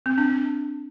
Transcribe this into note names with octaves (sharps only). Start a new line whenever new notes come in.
C4
D4
D4